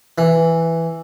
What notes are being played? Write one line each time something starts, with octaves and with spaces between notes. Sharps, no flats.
E3